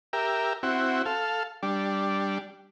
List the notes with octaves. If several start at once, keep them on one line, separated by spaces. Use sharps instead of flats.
G4 A#4 E5
C4 E4 F#4
A4 F5
G3 D4